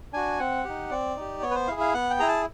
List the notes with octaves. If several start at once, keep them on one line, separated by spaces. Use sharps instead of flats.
D4 F#4 G#5
C4 F#5
D#4 G4
C4 D5
D#4 G4
B3 C#5
B4
C5
E4 G#4 F5
F5
B3 F#5
G5
E4 G#4 A#5
A5